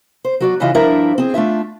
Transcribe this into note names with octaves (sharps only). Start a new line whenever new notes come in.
C5
F#3 F#4 D5
C#3 E3 E4 F4 D#5
G2 F3 D4 E4 A#4 E5
C4 G#4
A3 D4 F4 E5